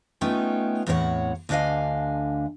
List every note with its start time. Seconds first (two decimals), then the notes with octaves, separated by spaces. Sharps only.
0.21 A3 B3 C#4 D#4 F4 G5
0.87 E2 A2 C4 D4 C#5 F#5
1.49 D2 D3 D4 D#5 F5 G#5